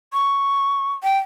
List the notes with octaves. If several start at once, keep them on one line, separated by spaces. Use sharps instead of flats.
C#6
G5